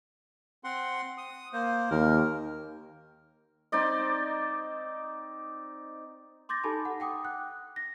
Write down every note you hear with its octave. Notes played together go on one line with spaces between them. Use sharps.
C4 F#5 C6
D#6
A#3 C5
D#2 A#4
C4 D#4 D5 D#5
C6 D6 G6 A6 A#6
D#4 G4 A4 G#5 A5 B5
F#5
F#5 G5 D6 D#6
F#6
A#6